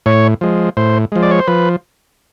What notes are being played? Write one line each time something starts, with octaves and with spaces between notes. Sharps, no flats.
A2 C#5
F3 G#3
A2 C5
F3 G#3
D5
C#5
C5
F3 B4